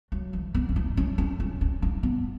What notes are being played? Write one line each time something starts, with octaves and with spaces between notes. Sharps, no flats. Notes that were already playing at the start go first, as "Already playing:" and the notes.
F#3
E3
B3
C#4
D#4
C#4
C#4
C#4
C#4
D#4
B3